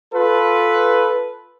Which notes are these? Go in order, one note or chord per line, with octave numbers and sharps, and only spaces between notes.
F4 A4 B4